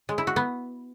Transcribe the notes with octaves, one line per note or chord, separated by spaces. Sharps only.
G#3
E4
F#4
B3